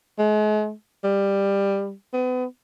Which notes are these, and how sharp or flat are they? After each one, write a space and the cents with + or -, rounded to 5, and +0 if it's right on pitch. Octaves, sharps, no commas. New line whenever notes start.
G#3 +40
G3 +15
B3 +35